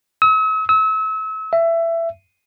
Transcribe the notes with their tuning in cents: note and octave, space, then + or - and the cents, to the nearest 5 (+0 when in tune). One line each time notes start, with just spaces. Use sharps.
E6 -45
E6 -35
E5 +20